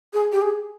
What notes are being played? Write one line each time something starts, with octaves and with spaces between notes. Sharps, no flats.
G#4
G4
G#4